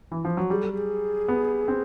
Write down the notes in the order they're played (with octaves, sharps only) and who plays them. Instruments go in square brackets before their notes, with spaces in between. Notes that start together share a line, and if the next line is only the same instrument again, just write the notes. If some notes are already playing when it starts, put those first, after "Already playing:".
[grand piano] E3
F3
F#3
[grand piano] G3 [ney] G#4
[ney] A4
G#4
[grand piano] B3
C4